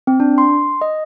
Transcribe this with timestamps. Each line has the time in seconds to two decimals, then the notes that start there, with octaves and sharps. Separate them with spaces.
0.07 C4
0.20 D4
0.38 C6
0.81 D#5